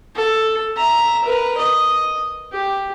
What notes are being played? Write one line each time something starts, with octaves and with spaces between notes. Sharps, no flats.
A4
E5 A#5
A#4 B4
D#5
G4